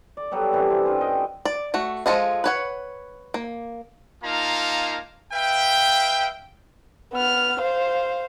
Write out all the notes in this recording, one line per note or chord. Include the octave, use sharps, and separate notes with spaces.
D5
F#3 G3 B3 A4
C3 E3 C#4 D4
B3 C4
G2 F4
C#4 D#5 G5
D5
A3 F#4
F3 G#3 A4 D#5 F5
B4 C#5 F#5
A#3
A#3 D#4 F4 F5 A5 A#5
B4 E5 F5 G5
B3 F6
C5 F5